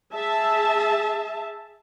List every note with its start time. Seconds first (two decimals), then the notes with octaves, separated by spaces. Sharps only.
0.14 G#4 E5 A5